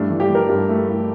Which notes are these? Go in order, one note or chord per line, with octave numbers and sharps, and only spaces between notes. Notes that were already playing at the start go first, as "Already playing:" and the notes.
Already playing: G2 A3 D4
E3
G4
E3
A#4
G2
A3
A3